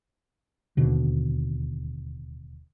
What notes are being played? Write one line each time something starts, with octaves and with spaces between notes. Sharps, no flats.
D1 D#2 B2 D3